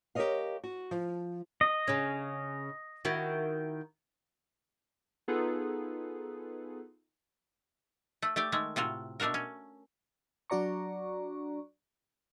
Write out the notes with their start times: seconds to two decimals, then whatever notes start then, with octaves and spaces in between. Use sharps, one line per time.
0.15 G4 A#4 C5 C#5 D#5 F5
0.64 F#4
0.91 F3
1.61 D#5
1.87 C#3 C#4
3.05 D#3 E4 F#4
5.28 B3 D#4 F4 G#4 A4 B4
8.22 A3
8.36 A3 G4 D5
8.52 D#3 G#3 A3
8.76 A2 C3 F4 F#4
9.20 B2 A3 D4 F#4 A#4
9.34 C#4
10.50 F#3 D4 F#4 D5 A#5 C#6